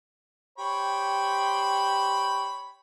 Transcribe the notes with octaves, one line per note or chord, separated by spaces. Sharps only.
G4 C5 C#5 G5 B5